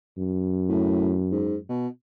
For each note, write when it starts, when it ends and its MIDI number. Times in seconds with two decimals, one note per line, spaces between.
0.18 1.70 42
0.69 1.16 45
1.31 1.56 44
1.69 1.88 47